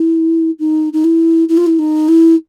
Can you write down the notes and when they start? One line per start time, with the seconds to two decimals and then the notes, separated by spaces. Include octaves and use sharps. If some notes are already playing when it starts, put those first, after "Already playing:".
Already playing: E4
0.59 D#4
0.93 D#4
1.04 E4
1.48 E4
1.57 F4
1.66 E4
1.79 D#4
2.08 E4